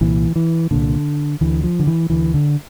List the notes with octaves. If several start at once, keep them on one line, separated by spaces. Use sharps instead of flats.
C2 A#2 E3
E3
C2 A#2 D3
D2 D3 E3
F3
D3
E3
D2 D3 E3
D3